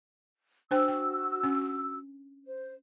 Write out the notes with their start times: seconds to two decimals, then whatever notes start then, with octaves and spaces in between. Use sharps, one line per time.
0.71 D4 F#4 C5 G5 E6
0.88 G5
1.43 C#4
2.46 C5